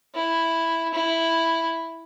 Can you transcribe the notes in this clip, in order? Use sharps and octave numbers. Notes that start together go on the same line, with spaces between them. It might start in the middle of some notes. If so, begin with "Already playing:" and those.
E4
E4